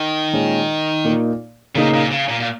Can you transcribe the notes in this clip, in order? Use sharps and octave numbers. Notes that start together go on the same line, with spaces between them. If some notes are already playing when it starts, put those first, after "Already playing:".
Already playing: D#3
A#2 G#3 C#4
A#2 A#3 D#4
A#2 C#3 A#3 D#4
A#2
C#3
A#2
A#2